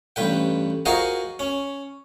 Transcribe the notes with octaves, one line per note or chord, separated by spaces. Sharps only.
A1 G2 B4 G5
F4 F#4 G#4 A#4 C5 D#5
C#4